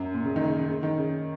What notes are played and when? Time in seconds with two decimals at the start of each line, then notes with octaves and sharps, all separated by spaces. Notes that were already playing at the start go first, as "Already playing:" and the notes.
Already playing: F#2
0.14 A#2
0.25 C#3
0.36 D#3
0.47 C#3
0.58 C#3
0.68 C#3
0.83 D#3
0.98 C#3